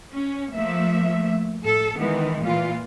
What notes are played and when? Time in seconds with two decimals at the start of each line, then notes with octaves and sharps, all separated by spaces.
0.13 C#4
0.53 F3 A3 A#3 E5
1.61 A2 A4
1.96 D#3 E3 G#3 B3
2.42 A#2 E3 F4